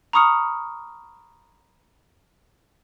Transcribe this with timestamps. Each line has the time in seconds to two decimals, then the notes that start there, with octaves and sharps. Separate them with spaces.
0.13 A#5 B5 C#6 D#6 F6 C#7